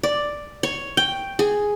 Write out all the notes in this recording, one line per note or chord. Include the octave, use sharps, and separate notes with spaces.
D5
C#5
G5
G#4